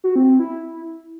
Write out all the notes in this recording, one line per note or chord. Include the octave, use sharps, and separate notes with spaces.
F#4
C4
C4
E4